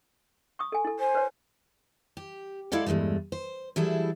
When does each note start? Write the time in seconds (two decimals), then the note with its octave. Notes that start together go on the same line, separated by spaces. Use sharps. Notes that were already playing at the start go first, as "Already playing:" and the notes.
0.59 C#6 D#6
0.72 A4 G#5
0.85 E4 A4
0.99 C5 G#5
1.15 B4 C#5
2.17 G4
2.72 G#3 E4 A4 D5 F5 F#5
2.86 E2 G2 C#3 G#3 A3
3.32 C5
3.76 E3 F#3 G3 E4 G#4 A4